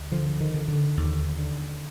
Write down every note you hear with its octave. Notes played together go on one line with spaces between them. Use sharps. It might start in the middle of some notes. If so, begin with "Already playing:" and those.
Already playing: D2
D3 F3
D#3
D3
D3
D#2
D3